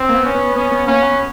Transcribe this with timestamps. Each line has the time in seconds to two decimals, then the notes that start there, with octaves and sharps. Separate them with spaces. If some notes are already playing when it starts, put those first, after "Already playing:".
Already playing: C4
0.09 A#3
0.14 B3
0.25 C#4
0.35 B3
0.56 B3 C#4
0.72 B3
0.87 A#3 C#4
1.02 B3